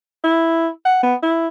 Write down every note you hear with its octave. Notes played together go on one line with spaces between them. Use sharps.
E4
F#5
B3
E4